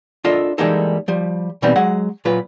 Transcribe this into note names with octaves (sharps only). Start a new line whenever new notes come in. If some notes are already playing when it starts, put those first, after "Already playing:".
D4 F4 A4 A#4 D#5 E5
E3 G3 G#3 A#3 D#4 A4
F3 G3
B2 E3 G3 B3 C4 D#4
F#3 G#3 C#5 F#5
A#2 F#3 F4 B4